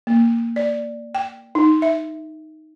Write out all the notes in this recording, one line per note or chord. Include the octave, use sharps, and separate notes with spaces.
A#3
D5
G5
D#4
E5